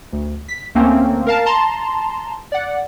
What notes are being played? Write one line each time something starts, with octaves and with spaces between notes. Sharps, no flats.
D2
B6
D2 A3 A#3 C4 C#4
A#4 F5 A5
A5 A#5 C6
D5 F#5